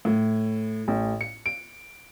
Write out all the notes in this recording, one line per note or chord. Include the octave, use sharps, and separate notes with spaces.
A2
A1
C#7
D7